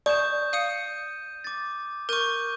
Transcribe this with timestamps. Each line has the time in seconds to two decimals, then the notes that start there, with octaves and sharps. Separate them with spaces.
0.06 D5 C#6 D#6 G6 E7
0.53 F5 D#6 C#7 D#7
1.44 D6 A6
2.09 A#4 C#6 G6 D#7